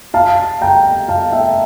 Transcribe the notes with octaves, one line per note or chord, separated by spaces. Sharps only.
F5 A5
G5 A#5
F5 A5
E5 G5